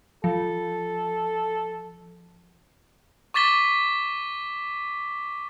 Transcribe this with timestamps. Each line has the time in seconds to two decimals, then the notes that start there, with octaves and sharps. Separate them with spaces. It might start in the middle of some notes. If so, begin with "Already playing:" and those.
0.24 F3 A4
3.34 C#6 D6 A6 B6 G7